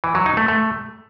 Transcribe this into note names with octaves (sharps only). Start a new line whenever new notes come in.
E3
F#3
D#4
A3
A3